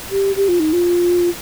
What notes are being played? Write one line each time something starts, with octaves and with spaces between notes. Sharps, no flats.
G4
G4
F4
D#4
F4